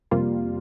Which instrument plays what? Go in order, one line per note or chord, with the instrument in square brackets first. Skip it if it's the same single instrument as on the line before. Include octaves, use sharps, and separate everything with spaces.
[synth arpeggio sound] F2 C3 G3 A#3 F4